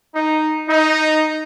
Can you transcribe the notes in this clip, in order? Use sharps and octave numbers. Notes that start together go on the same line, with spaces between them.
D#4
D#4